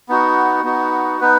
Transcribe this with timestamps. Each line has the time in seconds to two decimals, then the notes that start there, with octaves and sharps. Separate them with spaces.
0.09 B3 D#4 F#4
0.64 B3 D#4 F#4
1.21 B3 D#4 B4